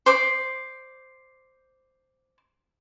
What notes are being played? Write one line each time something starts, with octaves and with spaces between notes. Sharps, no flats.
C5 D5 D6